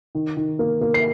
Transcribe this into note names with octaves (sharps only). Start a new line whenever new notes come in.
D#3
D#3
A#3
A#3
C7